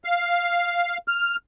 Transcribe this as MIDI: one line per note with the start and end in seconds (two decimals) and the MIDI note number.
0.04 0.98 77
1.08 1.36 89